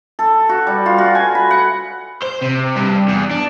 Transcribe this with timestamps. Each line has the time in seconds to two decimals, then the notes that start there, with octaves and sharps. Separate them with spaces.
0.19 A4
0.49 F#4
0.67 G3
0.86 F4
0.98 F#4
1.15 G#5
1.35 B5
1.51 F#5
2.23 C5
2.42 C3
2.76 G2
3.08 E2
3.31 D4